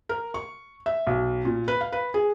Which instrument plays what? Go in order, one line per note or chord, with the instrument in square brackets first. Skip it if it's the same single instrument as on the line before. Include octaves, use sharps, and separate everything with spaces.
[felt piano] A#4
C#6
E5
B1
A#2
B4
F5
B4
G#4